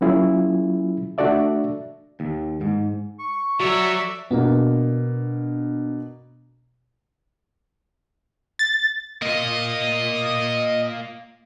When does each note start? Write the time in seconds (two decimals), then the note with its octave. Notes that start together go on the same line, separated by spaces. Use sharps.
0.01 F#3 A#3 C#4 E4 F4 G#4
1.18 A3 D4 F#4 A4 D5 E5
2.20 D#2
2.61 G#2
3.19 C#6
3.60 F#3 F#4 A4 C#5 D5 E5
4.31 B2 A#3 B3 D4
8.59 A6
9.22 A#3 F4 D#5